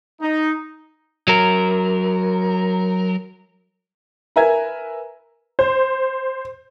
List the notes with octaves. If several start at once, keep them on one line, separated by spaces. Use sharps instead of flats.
D#4
F#3 A#4
A#4 B4 E5 G#5 A#5 G#6
C5